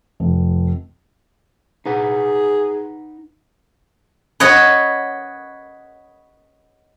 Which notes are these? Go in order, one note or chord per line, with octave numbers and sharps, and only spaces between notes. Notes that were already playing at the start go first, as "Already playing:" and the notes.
F1
D#4 G#4 B4 F#5
B4 C#5 D#5 F#5